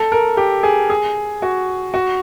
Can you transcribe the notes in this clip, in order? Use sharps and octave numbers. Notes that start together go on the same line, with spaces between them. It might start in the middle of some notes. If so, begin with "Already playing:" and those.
Already playing: A4
A#4
G4
G#4
G#4
F#4
F#4